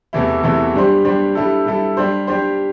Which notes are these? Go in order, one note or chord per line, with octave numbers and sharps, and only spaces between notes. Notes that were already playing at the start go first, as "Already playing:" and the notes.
E2 C3 E3 A3 E4
E2 C3 E3 A3 E4
G2 G3 D4 G4 C5
G2 G3 D4 G4 C5
G2 G3 E4 A4
G2 G3 E4 A4
G3 D4 G4 C5
G3 D4 G4 C5